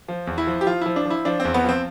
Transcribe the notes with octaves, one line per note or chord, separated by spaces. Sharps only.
F3
E2
E4
F3
G4
F3 F4
F3 E4
D4
F3 E4
F3 D4
E2 C4
B3
F3 C4